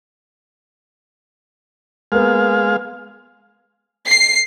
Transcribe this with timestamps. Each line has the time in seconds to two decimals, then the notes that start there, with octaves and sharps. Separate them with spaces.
2.12 G#3 A#3 B3 F5
4.07 C7